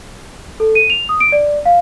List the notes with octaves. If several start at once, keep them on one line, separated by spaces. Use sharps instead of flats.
A4
D#7
F7
D#6
D7
D5
F5